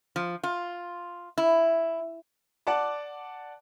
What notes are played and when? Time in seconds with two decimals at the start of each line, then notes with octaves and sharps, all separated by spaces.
0.16 F3
0.43 F4
1.38 E4
2.67 D5 F#5 A5 D6